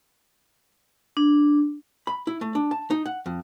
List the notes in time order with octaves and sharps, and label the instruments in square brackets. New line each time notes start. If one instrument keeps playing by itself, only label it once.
[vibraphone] D4
[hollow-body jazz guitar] B5
E4
A3
D4
A5
D#4
F#5
F2